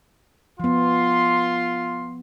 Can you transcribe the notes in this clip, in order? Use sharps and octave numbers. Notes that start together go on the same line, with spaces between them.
F3 B3 F4 C6